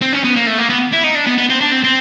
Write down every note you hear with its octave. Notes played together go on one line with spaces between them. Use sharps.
C4
C#4
B3
A#3
A3
A#3
B3
E4
D#4
D4
B3
B3
C4
D4
C4
C4